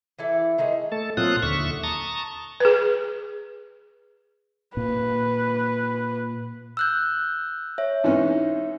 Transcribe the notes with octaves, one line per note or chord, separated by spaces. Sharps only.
E3 E4 A4 D5
D#3 G#3 D#4
A3 A4 A5
A#2 F#3 C4 F4 D#6 F#6
D#2 D3 E5 C#6
A5 A#5 C#6 D#6
G#4 B4
A#2 B4
E6 F#6 G6
C#5 E5
G#2 E3 C#4